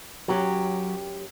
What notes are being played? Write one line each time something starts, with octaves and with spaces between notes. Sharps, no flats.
F#2 F#3 G4